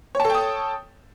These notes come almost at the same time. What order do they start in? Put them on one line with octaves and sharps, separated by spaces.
C#5 A5 A4 G5 D#6